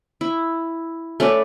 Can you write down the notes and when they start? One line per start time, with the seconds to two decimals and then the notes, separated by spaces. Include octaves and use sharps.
0.21 E4
1.20 A3 C#4 B4 D5